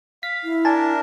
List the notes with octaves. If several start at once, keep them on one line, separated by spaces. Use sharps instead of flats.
F5 B6
E4
D4 A#4 G#5 A5